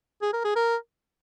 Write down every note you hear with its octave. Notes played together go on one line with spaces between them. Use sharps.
G#4
A#4
G#4
A#4